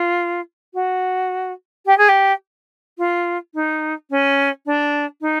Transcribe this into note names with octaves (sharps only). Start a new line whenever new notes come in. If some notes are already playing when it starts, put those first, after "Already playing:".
Already playing: F4
F#4
G4
G#4
G4
F4
D#4
C#4
D4
D#4